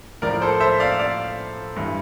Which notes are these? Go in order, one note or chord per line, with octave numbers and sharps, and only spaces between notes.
A2 F3 A#4 D5
A4 C5
C5 E5
D5 F5
D5 F5
G2 E3